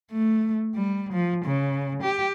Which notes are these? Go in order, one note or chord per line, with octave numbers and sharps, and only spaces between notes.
A3
G3
F3
C#3
G4